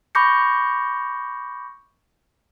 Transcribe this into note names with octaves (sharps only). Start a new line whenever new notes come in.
B5 C#6 D6 G6 A#6 C#7